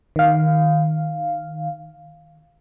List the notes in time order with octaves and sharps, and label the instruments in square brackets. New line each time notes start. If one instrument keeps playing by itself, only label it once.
[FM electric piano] D#3 F5